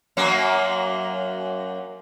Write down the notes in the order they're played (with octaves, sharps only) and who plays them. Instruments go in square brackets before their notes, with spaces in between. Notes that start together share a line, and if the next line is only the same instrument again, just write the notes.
[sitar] F#2 F#3 A#3